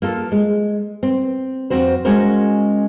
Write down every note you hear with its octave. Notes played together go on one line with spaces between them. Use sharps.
A#3 F4 A4
G#3
C4
F2 C4 F#4 C5
G#3 C#4 F#4 A#4 C5